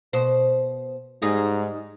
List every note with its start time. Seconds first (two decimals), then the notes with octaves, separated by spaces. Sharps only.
0.13 B2 C5
1.22 G#2 G3 D#4 G#4